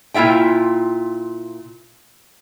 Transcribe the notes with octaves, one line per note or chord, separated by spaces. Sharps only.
A#2 E4 F4 E5 G5